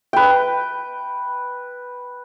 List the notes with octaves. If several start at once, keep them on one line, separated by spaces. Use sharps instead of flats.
B4 G5